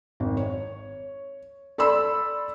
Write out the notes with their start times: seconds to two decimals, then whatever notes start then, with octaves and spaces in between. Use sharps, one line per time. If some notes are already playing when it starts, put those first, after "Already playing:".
0.20 G#1
0.37 C#5
1.78 A4 D5 B5 C6 E6